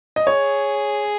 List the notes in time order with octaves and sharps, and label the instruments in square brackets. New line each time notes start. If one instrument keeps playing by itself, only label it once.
[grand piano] D#5
[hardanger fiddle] G#4 [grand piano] C#5